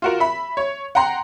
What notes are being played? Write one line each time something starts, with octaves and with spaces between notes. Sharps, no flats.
F4 F#4 A#4
E5 B5
C#5
F#5 G5 A#5 C6